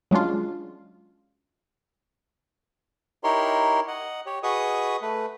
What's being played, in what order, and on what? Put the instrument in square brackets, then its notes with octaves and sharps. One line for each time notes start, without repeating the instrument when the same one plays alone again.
[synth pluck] F#3 G#3 C#4 D4 F4
[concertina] D#4 E4 G4 A#4 C#5 C6
D#5 F#5
G4 C#5
F#4 G#4 B4 D#5 C#6 D#6
A3 B4